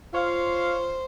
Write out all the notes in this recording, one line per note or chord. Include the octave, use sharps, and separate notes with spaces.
F4 C5 C#5 F5